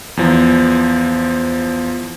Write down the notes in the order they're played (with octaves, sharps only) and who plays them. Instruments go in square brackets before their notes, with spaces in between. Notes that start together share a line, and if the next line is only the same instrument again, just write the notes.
[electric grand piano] E2 F3